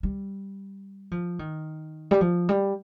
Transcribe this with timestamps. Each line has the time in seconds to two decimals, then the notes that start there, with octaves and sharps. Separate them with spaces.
0.03 G3
1.11 F3
1.39 D#3
2.11 G3
2.21 F3
2.49 G3